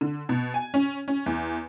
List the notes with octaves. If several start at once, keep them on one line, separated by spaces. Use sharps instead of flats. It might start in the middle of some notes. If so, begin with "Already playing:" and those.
D3
B2
G#5
C#4
C#4
E2